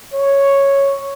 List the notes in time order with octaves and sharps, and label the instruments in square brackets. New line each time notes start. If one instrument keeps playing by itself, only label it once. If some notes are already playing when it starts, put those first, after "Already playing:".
[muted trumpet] C#5